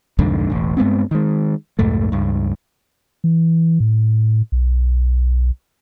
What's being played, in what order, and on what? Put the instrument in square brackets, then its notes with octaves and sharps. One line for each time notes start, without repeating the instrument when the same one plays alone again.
[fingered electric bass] C2 F2 G#2 D3
E1 A1
G2 G#3 B3 C4
D#3 G#3
C2 F2 G#2 A3
C#2 G2
[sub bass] E3
A2
B1